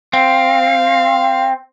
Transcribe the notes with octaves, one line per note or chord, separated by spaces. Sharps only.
C4 F5